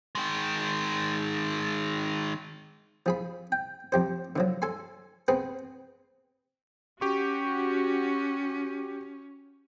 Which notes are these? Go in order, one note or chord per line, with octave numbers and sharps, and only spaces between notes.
D#3 G#3
F3 G#4 B5
G5
F2 G4 C5
D3 F3 F#3
A4 G#5 C6
B3 C4 G#4 B4
C#4 F#4 G4 C#6